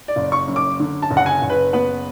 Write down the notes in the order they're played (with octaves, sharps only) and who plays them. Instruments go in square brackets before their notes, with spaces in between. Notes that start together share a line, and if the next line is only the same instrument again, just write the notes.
[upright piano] D5
F#1
C#6
F#2
D6
D3
A5
F#1
F#5
G#5
F#1
B4
B3 B4